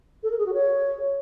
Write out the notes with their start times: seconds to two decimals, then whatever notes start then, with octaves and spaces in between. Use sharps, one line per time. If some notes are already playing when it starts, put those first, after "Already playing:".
0.23 A4
0.30 A#4
0.38 G#4
0.45 F#4
0.53 C#5